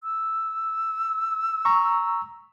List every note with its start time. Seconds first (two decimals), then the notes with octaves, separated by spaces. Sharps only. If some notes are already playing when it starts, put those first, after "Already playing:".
0.04 E6
1.65 A#5 C#6